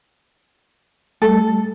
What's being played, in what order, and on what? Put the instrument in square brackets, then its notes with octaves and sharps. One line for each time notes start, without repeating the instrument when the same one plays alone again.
[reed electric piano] G3 A3 [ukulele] A4